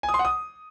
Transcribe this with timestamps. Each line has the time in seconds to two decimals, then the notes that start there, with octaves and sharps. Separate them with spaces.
0.03 G#5
0.09 D#6
0.14 C6
0.19 F#5
0.25 D#6